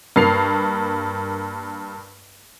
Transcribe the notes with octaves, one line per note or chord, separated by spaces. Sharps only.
G2 A#3 C7 F7